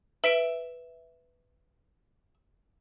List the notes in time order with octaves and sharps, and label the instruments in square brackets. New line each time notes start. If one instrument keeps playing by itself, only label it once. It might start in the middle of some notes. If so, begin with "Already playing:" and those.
[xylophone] B4 B6 D7 [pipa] E5